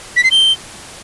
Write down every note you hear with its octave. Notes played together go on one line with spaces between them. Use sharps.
B6
C7
G7